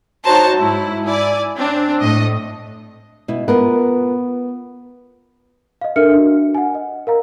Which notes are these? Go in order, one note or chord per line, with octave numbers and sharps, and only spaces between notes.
D#4 F#4 C5 C#5 A5 A#5
G#2 E4
E4 D5 G#5
C4 D4
A2 D#5
B2 E4
B3 F4 A#4 B4
D#5 F5
D4 A4 A#4 E5 F6 C#7
D4 F#4
F#5 G#5
D#5
A#4 F5 A#5